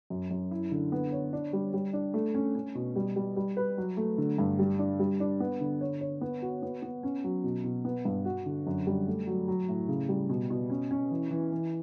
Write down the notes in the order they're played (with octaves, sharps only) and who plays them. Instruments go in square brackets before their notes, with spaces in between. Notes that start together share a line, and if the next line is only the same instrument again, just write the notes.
[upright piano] F#2
F#2
E4
D3
B3
C#5
D4
G3
G3
D4
A3
C#4
C#4
B2
G3
G3
G3
B4
F#3
A3
D3
G2
G3
D4
G3
D4
B3
D3
C#5
C#5
B3
F#4
B3
B3
C#4
F#3
B2
B2
B3
G2
F#4
D3
F#2
G3
A3
F#3
F#3
A2
C#3
G3
B2
B2
C#4
C#4
E3
E3
E3